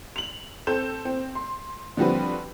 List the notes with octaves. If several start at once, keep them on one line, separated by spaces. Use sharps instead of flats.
F7 F#7
C4 A4 G6 E7
C4
C6
D3 F3 G3 C4 F#4 B4